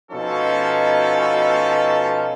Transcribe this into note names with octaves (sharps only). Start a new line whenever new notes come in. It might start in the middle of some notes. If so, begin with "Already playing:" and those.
B2 F3 C#4 D#4 A4